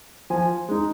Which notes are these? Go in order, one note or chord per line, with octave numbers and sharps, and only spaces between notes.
F3 G#5
G#3 D#4